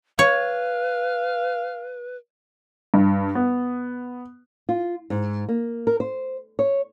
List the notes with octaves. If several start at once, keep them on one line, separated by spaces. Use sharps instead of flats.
B4 C#5 F5
G2
B3
F4
G#2
A#3
A#4
C5
C#5